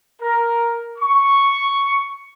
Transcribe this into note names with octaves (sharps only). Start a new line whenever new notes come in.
A#4
C#6